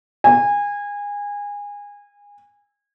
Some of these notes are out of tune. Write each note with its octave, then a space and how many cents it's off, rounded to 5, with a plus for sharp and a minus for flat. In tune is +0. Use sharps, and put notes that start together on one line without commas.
G#5 -25